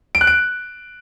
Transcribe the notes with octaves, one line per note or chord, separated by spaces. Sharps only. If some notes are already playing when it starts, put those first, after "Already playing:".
D7
F#6
D7